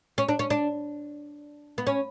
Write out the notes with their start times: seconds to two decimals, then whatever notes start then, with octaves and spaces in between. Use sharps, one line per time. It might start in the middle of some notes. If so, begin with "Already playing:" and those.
0.18 C#4
0.29 D4
0.39 C#4
0.50 D4
1.78 B3
1.87 C#4